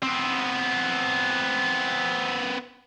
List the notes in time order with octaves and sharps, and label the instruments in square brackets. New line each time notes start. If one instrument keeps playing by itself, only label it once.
[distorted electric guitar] B3 C4